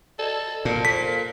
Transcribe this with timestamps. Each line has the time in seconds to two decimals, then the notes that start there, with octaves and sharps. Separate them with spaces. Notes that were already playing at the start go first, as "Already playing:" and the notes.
0.19 A4 D5 D#5
0.65 A#2 A#3 A5 G6
0.85 A4 C5 B6